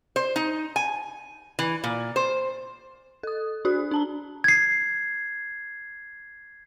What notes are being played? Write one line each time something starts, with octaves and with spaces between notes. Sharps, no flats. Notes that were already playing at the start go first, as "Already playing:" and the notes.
C5
D#4
G#5
E3
A#2
C5
A4 D#6
D4 F#4 D5 F#6
D4 A5 A#5
G#6 C7